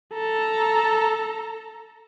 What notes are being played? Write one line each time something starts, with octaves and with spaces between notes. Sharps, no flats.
A4 A#5